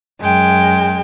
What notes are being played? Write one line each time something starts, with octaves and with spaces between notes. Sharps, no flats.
F#2 G#3 G5